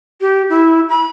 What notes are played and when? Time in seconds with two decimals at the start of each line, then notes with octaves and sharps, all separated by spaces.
0.21 G4
0.50 E4
0.89 B5